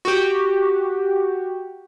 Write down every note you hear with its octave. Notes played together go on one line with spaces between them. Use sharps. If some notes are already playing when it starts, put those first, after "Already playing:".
F#4 G4